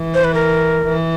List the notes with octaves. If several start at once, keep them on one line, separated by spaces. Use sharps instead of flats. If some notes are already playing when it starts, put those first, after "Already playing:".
Already playing: E3
C5
B4
A#4
E3